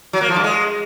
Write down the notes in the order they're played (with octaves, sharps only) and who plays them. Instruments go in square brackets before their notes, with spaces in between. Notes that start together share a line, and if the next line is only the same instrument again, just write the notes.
[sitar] F#3
A#3
F3
G2
G#3